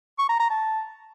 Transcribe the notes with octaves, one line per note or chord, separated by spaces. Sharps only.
C#6
A#5
A#5
A5